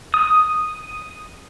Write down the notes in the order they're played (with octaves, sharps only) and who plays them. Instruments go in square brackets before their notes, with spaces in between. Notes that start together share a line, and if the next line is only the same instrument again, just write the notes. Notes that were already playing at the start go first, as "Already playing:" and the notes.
[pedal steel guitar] D#6